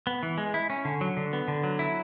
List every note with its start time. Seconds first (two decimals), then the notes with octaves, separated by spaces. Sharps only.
0.07 B3
0.23 E3
0.38 G#3
0.54 E4
0.70 C#4
0.85 D3
1.01 F#3
1.17 D3
1.33 B3
1.48 D3
1.64 F#3
1.79 E4